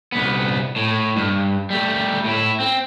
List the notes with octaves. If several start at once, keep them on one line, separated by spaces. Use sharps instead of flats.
C2 B3
A2
G2
G3 A3
A2 E4
C4